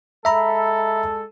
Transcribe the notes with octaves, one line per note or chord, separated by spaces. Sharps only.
G#3 A4 E5 A#5 B5